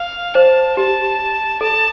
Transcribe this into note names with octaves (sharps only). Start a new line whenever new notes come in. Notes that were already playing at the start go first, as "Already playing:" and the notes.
Already playing: F5
C5 A5
G4 A5
A4 A5